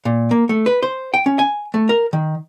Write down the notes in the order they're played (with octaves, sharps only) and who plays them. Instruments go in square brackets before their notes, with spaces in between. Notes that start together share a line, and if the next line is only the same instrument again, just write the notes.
[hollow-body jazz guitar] A#2
A#3
A3
B4
C5
G5
C#4
G#5
A3
A#4
D#3